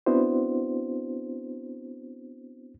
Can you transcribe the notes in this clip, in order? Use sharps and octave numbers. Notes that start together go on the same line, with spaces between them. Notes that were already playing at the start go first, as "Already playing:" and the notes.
B3 C4 D4 E4 F#4 C5